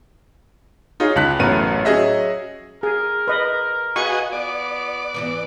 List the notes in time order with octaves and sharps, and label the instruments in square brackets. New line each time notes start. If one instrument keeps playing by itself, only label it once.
[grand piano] D#4 F4 G#4 C#5
C#2 A5 F#6 B6
A1 F#2 A3 B3 A#4 D#7
F#3 C#4 G#4 D#5 E5
[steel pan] G#4 [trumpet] A#4
[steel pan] B4 D#5
[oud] F4 B4 [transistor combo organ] F#4 G#4 D#5 [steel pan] C#6
[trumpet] B3 [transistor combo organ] D5
[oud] G#2 E3 B3